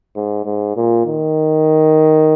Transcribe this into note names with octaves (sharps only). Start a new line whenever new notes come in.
G#2
G#2
A#2
D#3